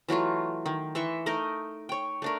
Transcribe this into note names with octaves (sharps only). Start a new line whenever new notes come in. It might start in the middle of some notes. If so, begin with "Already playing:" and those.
E3 F#3 A3 F4
D#3
E3 E5 C6 C#6
A3 D#4 A#4 D#5
C#5 G5
A3 D4 A#4